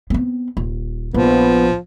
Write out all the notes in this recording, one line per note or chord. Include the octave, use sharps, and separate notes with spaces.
B3 C4
D#1
A#1 F3 B3